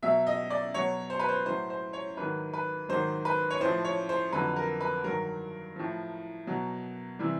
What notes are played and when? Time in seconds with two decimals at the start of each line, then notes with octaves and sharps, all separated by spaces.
0.02 B2 F#3 E5
0.27 D#5
0.50 D5
0.74 B2 F#3 C#5
1.10 C5
1.19 B4
1.29 C5
1.46 A2 F#3 C5
1.70 C5
1.93 C#5
2.17 G#2 D#3 F#3 B4
2.53 B4
2.89 G#2 D#3 F#3 C5
3.25 B4
3.50 C#5
3.60 A2 F3 C5
3.84 C#5
4.09 C5
4.33 F2 D3 F#3 B4
4.56 A#4
4.80 B4
5.04 G2 D#3 F#3 A#4
5.76 A2 F3
6.47 B2 F#3
7.19 C3 E3 G3